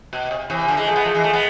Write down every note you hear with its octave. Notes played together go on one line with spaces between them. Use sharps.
B2
C3
C3 E3
D3 F3
E3 G#3
F3 A3
G#3 B3
F3 A3
E3 G#3
F3 A3
G#3 B3